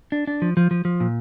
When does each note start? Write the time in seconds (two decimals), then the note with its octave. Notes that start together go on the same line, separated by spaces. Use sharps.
0.12 D4
0.27 D4
0.42 F3
0.57 F3
0.71 F3
0.85 F3
1.00 A#2